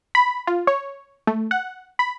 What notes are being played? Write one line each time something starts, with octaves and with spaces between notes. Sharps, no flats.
B5
F4
C#5
A3
F#5
B5